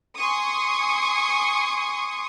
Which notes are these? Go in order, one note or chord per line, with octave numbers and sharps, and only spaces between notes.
G#5 C6 C#6 D#6